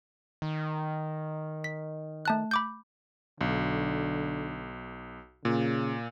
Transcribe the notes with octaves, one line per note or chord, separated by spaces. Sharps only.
D#3
B6
A3 A5 F#6
B5 D6 G6
B1 D3
A#2 C#3